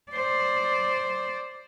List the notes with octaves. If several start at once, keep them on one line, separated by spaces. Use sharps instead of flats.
C5 D5